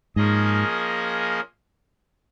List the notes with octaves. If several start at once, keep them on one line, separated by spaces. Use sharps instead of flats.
G#2 F3 A#3 C#4 G#4 D#5